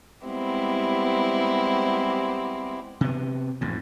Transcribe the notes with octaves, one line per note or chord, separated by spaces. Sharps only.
G3 G#3 B3 C4 E4 G4
C3 B3
A1 F2 G#2